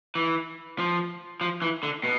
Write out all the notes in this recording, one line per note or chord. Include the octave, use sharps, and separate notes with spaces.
E3
F3
F3
E3
D3
B2